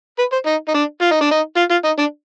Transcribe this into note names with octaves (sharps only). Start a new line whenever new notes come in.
B4
C5
D#4
D#4
D4
F4
D#4
D4
D#4
F4
F4
D#4
D4